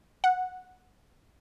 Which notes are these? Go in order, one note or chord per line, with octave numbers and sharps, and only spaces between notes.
F#5